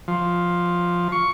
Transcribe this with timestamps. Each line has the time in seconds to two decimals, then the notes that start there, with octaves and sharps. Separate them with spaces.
0.08 F3
1.12 C#6